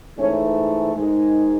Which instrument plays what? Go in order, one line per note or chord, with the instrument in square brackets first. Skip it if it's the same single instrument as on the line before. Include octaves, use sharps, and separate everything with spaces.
[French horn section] G#2 E3 A3 C#4
G#2 D#3 G#3